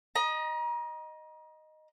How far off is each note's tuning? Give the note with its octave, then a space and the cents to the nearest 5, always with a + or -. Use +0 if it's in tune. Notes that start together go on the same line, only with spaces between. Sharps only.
D#5 -5 A#5 +35